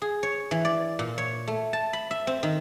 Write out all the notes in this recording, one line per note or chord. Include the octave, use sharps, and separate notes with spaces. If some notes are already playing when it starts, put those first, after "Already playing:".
G#4
C#5
E3
D5
A#2
C#5
A3
A5
B5
E5
C4
D#3